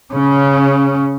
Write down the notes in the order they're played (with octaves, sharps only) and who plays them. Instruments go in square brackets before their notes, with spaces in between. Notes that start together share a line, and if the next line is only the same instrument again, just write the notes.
[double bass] C#3 C#4